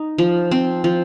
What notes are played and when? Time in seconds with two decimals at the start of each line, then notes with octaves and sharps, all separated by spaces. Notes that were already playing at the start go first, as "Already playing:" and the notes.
Already playing: D#4
0.18 F3
0.51 C4
0.84 F3